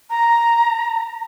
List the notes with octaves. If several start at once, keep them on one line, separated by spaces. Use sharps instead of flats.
A#5